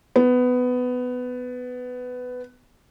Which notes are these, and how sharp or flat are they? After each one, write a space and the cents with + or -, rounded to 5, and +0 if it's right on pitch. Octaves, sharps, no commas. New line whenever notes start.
B3 +15